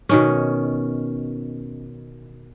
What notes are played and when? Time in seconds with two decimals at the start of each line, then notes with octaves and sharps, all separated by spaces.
0.09 B2 D#3 C#4